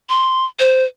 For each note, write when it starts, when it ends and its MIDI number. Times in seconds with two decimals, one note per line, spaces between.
0.09 0.45 84
0.59 0.84 72